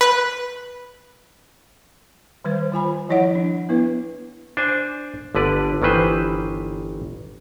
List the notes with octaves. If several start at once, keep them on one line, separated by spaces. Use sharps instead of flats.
B4 F#6
D#3 G3 B4 C5
D#3 F4 G#5 B5
F3 E4 C#5 D#5 F#5
D4
B3 E4 B4
D4 C5 G#5
G1 D3 B4 D5
G1 D#3 E3 B4 C5